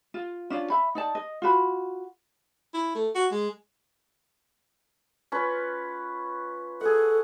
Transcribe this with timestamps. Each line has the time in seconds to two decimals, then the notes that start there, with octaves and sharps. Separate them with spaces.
0.14 F4
0.50 C#4 D4 F4
0.70 E5 B5
0.95 D#4 D5 A5
1.15 D#5
1.42 F4 F#4 B5
2.74 E4
2.95 A3
3.15 F#4
3.32 G#3
5.32 C#4 F4 B4
6.81 G#4 A4 F#5